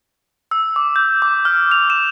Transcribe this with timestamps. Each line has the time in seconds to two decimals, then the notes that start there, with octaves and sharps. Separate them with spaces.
0.51 E6
0.76 D6
0.96 G6
1.22 D6
1.45 F6
1.71 F7
1.90 E7